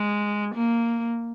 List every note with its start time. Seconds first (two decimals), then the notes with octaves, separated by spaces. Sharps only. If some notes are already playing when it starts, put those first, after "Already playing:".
Already playing: G#3
0.55 A#3